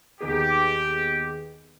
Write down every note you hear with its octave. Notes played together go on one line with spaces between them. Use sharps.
D#2 D#3 B3 D#4 G4 G#4